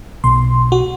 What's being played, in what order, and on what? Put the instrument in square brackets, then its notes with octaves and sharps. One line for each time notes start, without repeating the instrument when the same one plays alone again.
[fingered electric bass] B1 [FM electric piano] C6
[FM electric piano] F#4